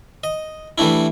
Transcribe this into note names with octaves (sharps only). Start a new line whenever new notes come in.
D#5
E3 G3 A3 D4 E4